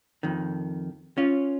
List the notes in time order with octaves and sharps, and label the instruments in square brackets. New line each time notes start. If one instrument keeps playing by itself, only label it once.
[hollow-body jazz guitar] F2 D#3
C#4 F4